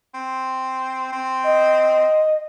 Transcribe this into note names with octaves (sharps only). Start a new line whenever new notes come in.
C4
C4
D#5